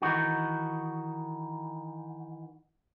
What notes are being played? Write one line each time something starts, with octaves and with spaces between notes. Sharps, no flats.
D#3 E3 D#4 F#4